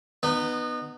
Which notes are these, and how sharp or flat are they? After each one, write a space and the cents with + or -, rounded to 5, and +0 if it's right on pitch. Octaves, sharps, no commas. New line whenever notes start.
B3 +0 D#4 -30